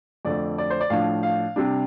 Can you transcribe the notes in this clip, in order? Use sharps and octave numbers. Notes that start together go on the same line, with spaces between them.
F2 D3 A3 D5
D5
C5
D5
A2 F3 D4 F5
F5
C3 G3 D4